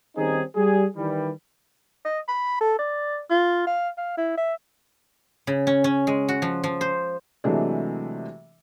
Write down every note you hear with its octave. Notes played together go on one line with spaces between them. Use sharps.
D#3 G3 C4 C#4 D#4 G#4
G3 G#4
D#3 E3 G3
D#5
B5
A4
D5
F4
F5
F5
E4
E5
C#3
C#4
C#4
G#3
F#4
F3
F3
C5
C3 E3 F#3 G#3 A3 D4